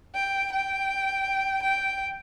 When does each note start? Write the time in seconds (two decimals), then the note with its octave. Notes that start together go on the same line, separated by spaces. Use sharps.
0.15 G5
0.52 G5
1.63 G5